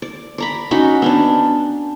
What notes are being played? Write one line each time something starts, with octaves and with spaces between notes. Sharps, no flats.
D5
D5 A#5 B5
C#4 D#4 F#4 B5
B3 C#4 D4